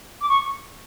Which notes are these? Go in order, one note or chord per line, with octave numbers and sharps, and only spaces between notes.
D6
C#6